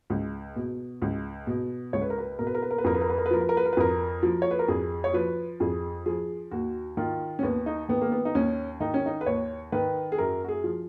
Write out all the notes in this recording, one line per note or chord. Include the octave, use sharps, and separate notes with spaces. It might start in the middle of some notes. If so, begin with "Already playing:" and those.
C#2
B2
C#2
B2
C#2 C#5
B4
A#4
B4
B2 A#4
B4
A#4
B4
A#4
B4
F2 A#4
B4
A#4
B4
A#4
B4
F3 A#4
B4
A#4
B4
A#4
B4
F2 A#4
F3
C#5
B4
A#4
F2 G#4
C#5
F3 B4
F2 G#4
F3 G#4
D#2 F#4
D#3 F4
C#4
D#2 B3
D#4
D#3 B3
A#3
B3
D#4
D#2 C#4
D#3 D#4
C#4
D#4
B4
D#2 C#5
D#3 B4
G#4
F#2 A#4
F#4
G#4
F3